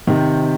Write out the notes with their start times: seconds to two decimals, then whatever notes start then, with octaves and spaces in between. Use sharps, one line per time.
0.07 C3 D#3